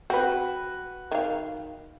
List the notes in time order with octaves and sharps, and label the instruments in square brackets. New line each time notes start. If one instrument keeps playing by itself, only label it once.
[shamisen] C4 [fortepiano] F#4 B4
[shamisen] D#3 F5